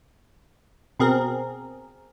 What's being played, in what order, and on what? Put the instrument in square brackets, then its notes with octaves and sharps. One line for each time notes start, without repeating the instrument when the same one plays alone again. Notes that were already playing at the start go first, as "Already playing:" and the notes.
[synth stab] B2 C4 G#4 A#4